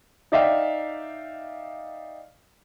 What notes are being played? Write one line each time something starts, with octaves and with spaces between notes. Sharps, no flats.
D#4 D5 E5 F5 G5